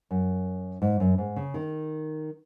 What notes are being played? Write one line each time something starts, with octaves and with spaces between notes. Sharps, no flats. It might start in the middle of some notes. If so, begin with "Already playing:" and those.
F#2
G#2
F#2
G#2
C#3
D#3